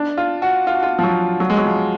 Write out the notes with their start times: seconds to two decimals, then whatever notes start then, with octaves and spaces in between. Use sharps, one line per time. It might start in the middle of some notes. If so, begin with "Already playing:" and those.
Already playing: D4
0.18 F4
0.42 F#4
0.67 F4
0.74 F#4
0.83 F4
0.99 F3
1.03 F#3
1.40 F#3
1.50 G#3
1.57 F#3
1.65 F3